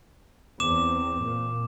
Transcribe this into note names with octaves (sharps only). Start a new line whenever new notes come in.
E2 C4 D6 E7
A#2